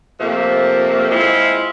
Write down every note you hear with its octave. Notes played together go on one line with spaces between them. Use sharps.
C3 F3 A3 A#3
G#3 C4 E4 F4